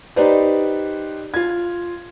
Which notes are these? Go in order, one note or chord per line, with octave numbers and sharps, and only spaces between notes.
D#4 G4 B4 C5 D5
F4 G#6